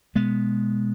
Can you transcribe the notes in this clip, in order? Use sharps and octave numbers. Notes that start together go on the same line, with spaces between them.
B2 G#3 B3